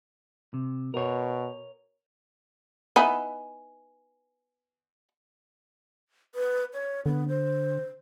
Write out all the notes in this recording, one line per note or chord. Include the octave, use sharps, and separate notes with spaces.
C3
B2 A#4 C#5
B3 D#4 E4 G#5
B4
C#5
D3 B3
C5